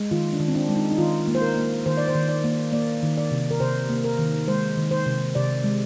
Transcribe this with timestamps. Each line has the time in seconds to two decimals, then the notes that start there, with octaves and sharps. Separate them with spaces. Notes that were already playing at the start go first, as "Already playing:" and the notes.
Already playing: G#3
0.11 D#3 F4
0.33 D4
0.40 D#3
0.48 C4
0.55 D4
0.69 G#3
0.76 D#4
0.91 D#4
0.98 D#3 F4
1.27 A#3
1.35 C5
1.41 A#4
1.57 A#3
1.86 D#3 C5
1.97 D5
2.08 C5
2.15 D#3
2.29 D5
2.44 A#3
2.73 A#3 D5
3.03 D#3
3.17 D5
3.31 C3
3.51 A#4
3.60 C3 C5
3.90 A#3
4.04 A#4
4.19 D#3
4.48 G#3 C5
4.77 D#3
4.91 C5
5.06 C3
5.35 C3 D5
5.64 G#3